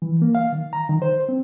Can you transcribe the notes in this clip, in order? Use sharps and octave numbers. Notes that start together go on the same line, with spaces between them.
E3
A#3
F5
D#3
A#5
D#3
C5
C4